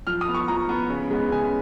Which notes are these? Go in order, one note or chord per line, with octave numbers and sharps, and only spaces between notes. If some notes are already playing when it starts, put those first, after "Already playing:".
F3 F6
D#6
B3
C#6
F3 A#5
B3
C#3
G#3 B3
C#3 G#5